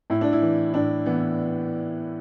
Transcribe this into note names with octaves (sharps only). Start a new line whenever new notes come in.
A2 E4
D4
E4
E3
A2 D4
E3 B3